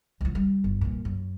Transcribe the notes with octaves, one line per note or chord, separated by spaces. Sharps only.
C#2 F3
G3
G1
G2 A#2
F#2